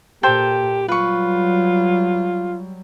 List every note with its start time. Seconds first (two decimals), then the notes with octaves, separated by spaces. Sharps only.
0.23 A#2 G4 A4 C5 G5
0.88 F#3 G3 F4 B4 C#6